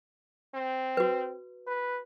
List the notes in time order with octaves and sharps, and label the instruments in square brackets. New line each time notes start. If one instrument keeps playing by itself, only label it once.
[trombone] C4
[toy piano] F#4 B4
[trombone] B4